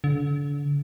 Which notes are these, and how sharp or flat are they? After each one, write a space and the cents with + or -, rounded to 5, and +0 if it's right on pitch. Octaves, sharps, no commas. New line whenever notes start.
D3 -35